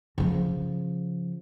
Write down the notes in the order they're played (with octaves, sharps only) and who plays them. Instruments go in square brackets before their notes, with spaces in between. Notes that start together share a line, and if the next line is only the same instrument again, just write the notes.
[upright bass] C#3 F3